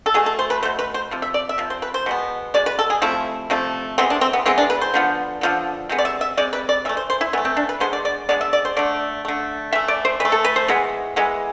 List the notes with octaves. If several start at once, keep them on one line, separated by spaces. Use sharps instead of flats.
A4
B2 A3 G#4
A4
C5
B4
B2 A3 C5
B4
C5
C3 F3
E5
D5
E5
C3 F3
C5
B4
C5
B2 G#3 B3
B2 G#3 D5
B4
A4
G#4
C3 F3 A3 E4
C3 F3 A3
E3 G#3 B3 C4
D4
C4
B3
E3 G#3 B3 C4
D4
B4
C5
D3 F3 B3
D3 F3 B3
C3 G#3 B3
D5
E5
E5
C3 G#3 D5
B4
D5
E3 A3 E5
C5
C5
E4
E3 A3 B3
C4
D4
B4
D3 G#3 B3 C5
D5
D5
D3 G#3 B3 D5
E5
D5
C5
D3 A3 D5
D3 A3
E3 A3 E5
D5
C5
E3 A3 B4
A4
B4
C5
E3 G#3 B3
E3 G#3 B3